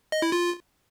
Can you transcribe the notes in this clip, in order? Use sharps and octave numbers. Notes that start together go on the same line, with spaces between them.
D#5
E4
F4